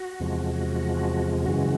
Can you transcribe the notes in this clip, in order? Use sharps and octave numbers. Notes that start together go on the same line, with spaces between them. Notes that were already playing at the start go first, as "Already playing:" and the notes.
Already playing: F#4
E2 C3 F3 G#3
F#2 C#3 E3 G#3 F#4